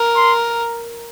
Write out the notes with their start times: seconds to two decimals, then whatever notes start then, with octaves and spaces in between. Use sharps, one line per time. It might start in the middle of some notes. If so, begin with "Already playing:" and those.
Already playing: A#4
0.16 C6